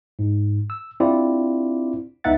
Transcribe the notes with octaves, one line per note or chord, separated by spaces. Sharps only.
G#2
E6
C4 D4 E4 F4 G4 D5
C#2 B3 D#4 E5 F#5 A6